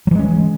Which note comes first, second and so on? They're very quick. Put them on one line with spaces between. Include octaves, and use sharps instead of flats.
F#3 E3 G#3 C#4